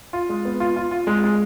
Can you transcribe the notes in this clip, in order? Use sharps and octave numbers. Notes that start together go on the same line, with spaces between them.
F4
G#3
B3
F4
F4
F4
G#3
G#3